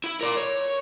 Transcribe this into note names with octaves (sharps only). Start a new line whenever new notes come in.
E4
A#4 D5
C#5